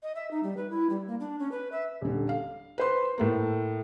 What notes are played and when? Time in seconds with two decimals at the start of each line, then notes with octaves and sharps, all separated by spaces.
0.03 D#5
0.15 E5
0.31 D#4
0.43 G3
0.57 B4
0.70 E4
0.90 G3
1.08 A#3
1.20 D4
1.39 C#4
1.52 B4
1.72 E5
2.01 D#1 D3
2.29 F5
2.78 B4 C5 C6
3.18 A2 A3 A#3